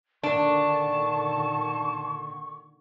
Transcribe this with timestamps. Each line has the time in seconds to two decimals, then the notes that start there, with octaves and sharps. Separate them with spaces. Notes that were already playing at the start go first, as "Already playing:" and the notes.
0.23 A#2 D3 D#3 D4 A5 C#6